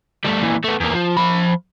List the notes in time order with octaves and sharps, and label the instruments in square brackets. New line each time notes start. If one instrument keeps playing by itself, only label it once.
[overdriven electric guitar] G3 A3
A#2 E3
A3 B3
E2 A#3
F3
F3 B5